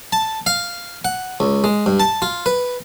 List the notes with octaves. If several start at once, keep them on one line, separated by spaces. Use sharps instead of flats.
A5
F5
F#5
C#2
G#3
G2
A5
F4
B4